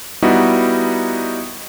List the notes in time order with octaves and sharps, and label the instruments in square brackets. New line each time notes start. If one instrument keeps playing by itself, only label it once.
[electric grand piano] G3 B3 D#4 E4 F#4